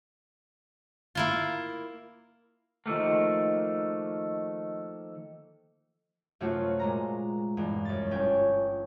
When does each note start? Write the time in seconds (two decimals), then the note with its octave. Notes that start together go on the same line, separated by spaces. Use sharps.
1.15 A#3 E4 F4
2.86 D#3 F3 A3 A#3
6.40 F#2 C3 F#3 A3 F4 F#4
6.79 A#2 G#3 A#5
7.57 E2 G2 B2
7.85 F#2 A6
8.11 G1 C#4 G5 G#5